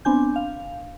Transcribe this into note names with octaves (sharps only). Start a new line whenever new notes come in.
B3 C4 D4 G#5 G6
F5